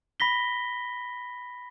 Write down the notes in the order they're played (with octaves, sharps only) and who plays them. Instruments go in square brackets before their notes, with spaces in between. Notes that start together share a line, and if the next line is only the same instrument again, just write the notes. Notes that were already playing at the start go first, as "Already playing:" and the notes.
[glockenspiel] B5 A#6 B6 G7